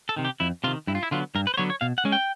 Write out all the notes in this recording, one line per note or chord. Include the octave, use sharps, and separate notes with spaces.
A4
C3 D#3
G4
F2 E4
C3 D#3 F4
G2 E4
F4
E4
D3 F#3 B3 F4
G2 A#4
B4
C5
D3 F#3 B3 C#5
C#5
B2 F5
F#5
G#3 C#4
G5